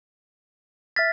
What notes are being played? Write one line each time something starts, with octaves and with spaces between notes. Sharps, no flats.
E5 F6 A6 B6